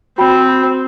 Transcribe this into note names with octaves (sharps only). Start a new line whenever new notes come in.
C4 F#4 G5 B5